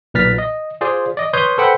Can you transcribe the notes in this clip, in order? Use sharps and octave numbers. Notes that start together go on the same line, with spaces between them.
B1 A#2 B4 F6 A6 B6
D#5
F4 G#4 C5 D5
D5 D#5
B4 C#5 C6 D#6 G6
A4 B4 C5 F#5 G5 B5